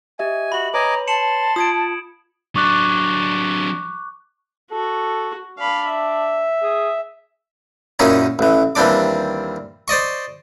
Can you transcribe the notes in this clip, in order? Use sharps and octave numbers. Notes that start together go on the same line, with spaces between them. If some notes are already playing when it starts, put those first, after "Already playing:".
G4 D#5 E5 G#5
F#4 B5 F#7
B4 C#5 D#5 G#5 A#5 D6
A5 C6 C#7 E7 F#7
F4 D#6 G#6 D7
F#3 D4 C#6 D6 F#6
F#4 A4
D4 F5 B5
E5
G#4
F#2 A#2 C#4 D#4 E4
A1 E3
D#2 E3 G3 C4 D4 D6
C5 D5 D#5 C#6